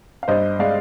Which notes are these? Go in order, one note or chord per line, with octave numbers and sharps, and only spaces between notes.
F5
G2 C5 D#5
G#3 D5 F5